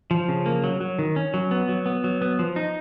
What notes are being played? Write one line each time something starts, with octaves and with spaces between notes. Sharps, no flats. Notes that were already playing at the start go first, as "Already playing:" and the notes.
F3
C#3
A#3
F#3
F#3
D#3
C#4
F#3
B3
F#3
B3
F#3
B3
F3
D#4